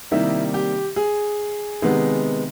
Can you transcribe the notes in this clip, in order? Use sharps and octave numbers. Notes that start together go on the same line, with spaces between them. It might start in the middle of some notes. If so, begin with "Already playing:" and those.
C3 D#3 G3 A#3 E4
G4
G#4
C3 D#3 G#3 B3